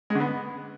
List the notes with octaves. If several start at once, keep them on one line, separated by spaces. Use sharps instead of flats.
G#3
D3
B3